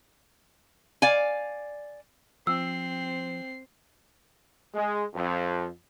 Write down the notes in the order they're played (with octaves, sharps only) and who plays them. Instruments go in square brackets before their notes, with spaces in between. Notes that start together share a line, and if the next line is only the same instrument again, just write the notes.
[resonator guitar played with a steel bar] D5 F5 G#5
[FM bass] F3 [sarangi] C4 [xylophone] E6 [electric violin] C7
[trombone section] G#3
F2